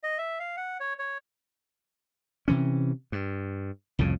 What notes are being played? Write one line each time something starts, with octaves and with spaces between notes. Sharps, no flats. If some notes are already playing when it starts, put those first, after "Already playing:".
D#5
E5
F5
F#5
C#5
C#5
C3 E3 C#4
G2
C2 F2 A2 C#3